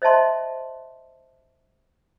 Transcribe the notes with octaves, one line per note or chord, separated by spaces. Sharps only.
C5 D#5 E5 A5 C6